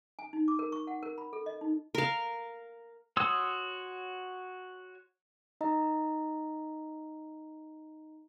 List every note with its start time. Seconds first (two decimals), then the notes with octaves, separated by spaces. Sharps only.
0.19 G#5
0.33 D#4
0.48 D6
0.59 A#4
0.72 C#6
0.87 F#5
1.03 A#4
1.18 B5
1.33 A4
1.46 D#5
1.61 D#4
1.95 A#4 F5
3.17 F#4 C#5 C6 D#6 E6
5.61 D#4 D#5 A#5